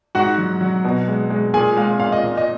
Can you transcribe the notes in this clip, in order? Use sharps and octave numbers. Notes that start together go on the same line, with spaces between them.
G#2 F#4 F#5
F#3
F#3
B2
G#3
G#3
A#2 G#4 G#5
G#3 F5
A#2 F5
D#5
A#2
D#5